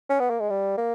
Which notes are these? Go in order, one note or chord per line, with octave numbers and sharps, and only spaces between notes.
C#4
B3
A#3
G#3
G3
A#3